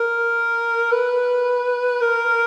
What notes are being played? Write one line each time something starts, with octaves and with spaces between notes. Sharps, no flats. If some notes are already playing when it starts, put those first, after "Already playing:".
Already playing: A#4
B4
A#4